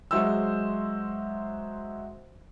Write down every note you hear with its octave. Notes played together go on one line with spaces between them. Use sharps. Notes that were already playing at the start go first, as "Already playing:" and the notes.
F#3 G#3 F#4 C5 E5 E6